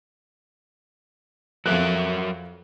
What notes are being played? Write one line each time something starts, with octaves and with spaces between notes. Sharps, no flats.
F2 F#3 A#4 E5 F#6